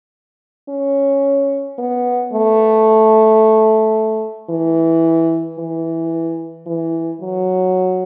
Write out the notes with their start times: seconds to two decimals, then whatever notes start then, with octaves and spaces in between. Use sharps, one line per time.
0.69 C#4
1.79 B3
2.33 A3
4.50 E3
5.59 E3
6.67 E3
7.21 F#3